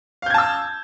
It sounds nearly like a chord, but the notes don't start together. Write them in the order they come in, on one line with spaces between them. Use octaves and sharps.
F5 G6 G#6 A5 E6